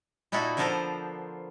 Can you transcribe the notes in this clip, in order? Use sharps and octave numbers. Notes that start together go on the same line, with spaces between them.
A#2 D#4 E4 F#4 A4
D3 F3 B3 A4 A#4 C5